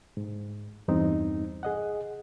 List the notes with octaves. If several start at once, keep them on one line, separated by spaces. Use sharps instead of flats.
G#2
E2 G2 C4 D#4
G#4 D#5 F#5